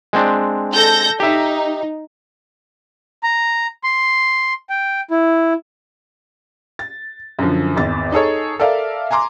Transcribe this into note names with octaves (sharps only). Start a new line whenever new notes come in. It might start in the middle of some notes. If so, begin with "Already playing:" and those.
G#3 C4 D4
A4 G6 A#6
D#4 G4 E5
A#5
C6
G5
E4
A6
F#2 D3 F3
G#1 E2 A6
D#4 G#4 A4 C#5
A4 A#4 D5 E5 F5
G#5 A#5 C6 D6